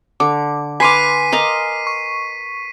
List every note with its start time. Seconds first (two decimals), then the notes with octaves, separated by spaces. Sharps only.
0.20 D3 D6
0.80 B4 F5 G#5 C6 D6 B6 C7 D#7
1.32 A#4 D#5 F5
1.87 C#6